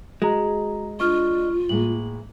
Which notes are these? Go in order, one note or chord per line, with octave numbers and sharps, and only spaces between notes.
G#3 F#4 G#4 A#5
D4 F4 D#5 C#6 F6
A2 G#3 A#3 F#7